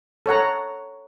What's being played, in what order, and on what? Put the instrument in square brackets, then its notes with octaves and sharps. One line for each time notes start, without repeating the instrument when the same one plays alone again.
[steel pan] A4 C#5 F#5 A#5